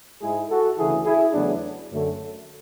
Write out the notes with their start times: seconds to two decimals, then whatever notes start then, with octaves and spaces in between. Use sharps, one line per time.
0.21 G#2 G#3 E4 G#4
0.50 F#4 A4
0.78 D2 C#3 E3 E4 G#4
1.05 E4 G#4
1.34 E2 C#3 F#3 A3 B3 D4
1.90 F#2 D3 A3